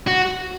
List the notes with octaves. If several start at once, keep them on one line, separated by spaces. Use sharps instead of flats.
F#4